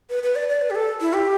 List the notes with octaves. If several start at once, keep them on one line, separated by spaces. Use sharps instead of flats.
B4
B4
D5
D5
B4
G4
A4
E4
G4